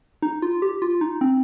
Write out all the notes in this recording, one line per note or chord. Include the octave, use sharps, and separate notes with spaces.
D#4
F4
G4
F4
D#4
C4